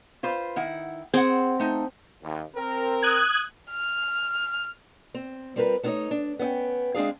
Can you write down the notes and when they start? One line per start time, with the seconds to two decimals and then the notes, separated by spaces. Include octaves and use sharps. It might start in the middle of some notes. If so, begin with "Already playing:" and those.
0.23 F4 B4 C5
0.56 D#3 E4 F#5
1.14 C4 G#4 F#5
1.60 A3 D#4
2.23 D#2
2.55 C4 A#4
3.03 D#6 F#6 G#6
3.71 F6
5.14 C4
5.56 G3 C4 F4 A#4 B4
5.83 A3 B3 D#4 C5 C#5 D#5
6.11 D4
6.39 B3 C#4 D#5 G5
6.95 G#3 C4 D4 G#4 F5